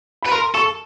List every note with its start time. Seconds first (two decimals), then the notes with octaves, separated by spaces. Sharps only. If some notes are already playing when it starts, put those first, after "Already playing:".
0.23 B4 B5
0.31 A#4 C6
0.54 A4 C#6